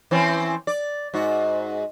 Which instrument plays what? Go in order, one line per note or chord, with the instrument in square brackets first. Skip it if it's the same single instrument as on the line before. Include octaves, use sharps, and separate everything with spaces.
[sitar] E3 C4 C#4
D5
G#2 F#4